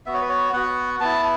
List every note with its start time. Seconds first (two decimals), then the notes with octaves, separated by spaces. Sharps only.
0.06 B3 F#4 E5
0.14 C#5
0.21 B4
0.29 C#5
0.53 B3 F#4 F#5
1.00 B3 E4 A5